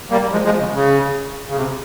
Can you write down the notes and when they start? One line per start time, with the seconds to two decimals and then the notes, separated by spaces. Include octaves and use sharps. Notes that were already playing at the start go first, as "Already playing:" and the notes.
0.11 G3 A#3
0.32 F3 G#3
0.45 F3 G#3
0.60 C#3
0.74 C#3
1.49 C#3
1.56 C3